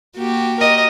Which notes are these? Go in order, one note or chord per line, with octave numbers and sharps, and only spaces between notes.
A#3 F#4 G4
A#4 D#5